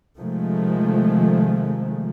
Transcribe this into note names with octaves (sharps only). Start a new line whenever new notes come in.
C3 D#3 F3 G#3 A3